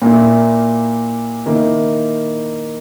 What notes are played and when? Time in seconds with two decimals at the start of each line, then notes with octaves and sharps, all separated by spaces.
0.02 A#2 A#3 E4
1.46 D#3 A#3 E4